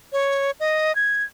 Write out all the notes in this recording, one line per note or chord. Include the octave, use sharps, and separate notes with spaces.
C#5
D#5
G#6